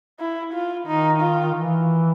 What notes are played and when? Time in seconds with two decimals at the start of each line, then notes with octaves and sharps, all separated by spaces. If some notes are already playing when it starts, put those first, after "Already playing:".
0.20 E4
0.54 F4
0.87 D#3 D#4
1.21 F4
1.55 E3